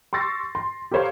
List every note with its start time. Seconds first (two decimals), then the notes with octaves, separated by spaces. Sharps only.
0.13 C6 C#6 E6 A6 A#6 C7
0.55 C6
0.91 G4 A4 A#4 C5 C#5 F5